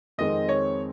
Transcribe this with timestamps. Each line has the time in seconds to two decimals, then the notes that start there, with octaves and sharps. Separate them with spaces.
0.18 F2 D#3 G#3 C4 D#4 D#5
0.49 C#5